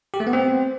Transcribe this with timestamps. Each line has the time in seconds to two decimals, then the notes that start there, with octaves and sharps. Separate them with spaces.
0.14 G4
0.20 A3
0.27 B3
0.33 C4